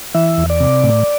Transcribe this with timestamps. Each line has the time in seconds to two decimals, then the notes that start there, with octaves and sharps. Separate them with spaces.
0.15 E3 E5
0.38 E2
0.50 D5
0.61 C3
0.84 A2